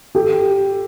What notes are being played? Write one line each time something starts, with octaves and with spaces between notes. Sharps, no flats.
G4 A4